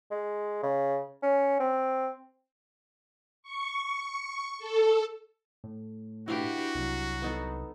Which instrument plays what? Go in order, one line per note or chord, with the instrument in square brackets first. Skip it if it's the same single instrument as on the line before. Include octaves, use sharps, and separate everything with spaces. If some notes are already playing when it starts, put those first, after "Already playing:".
[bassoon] G#3
C#3
C#4
C4
[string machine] C#6
A4
[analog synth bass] A2
[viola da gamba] D4 G4 B4 [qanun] E4 F5 [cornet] F#4
[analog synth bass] C2 [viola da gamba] F#3
[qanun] B3 D#4 A4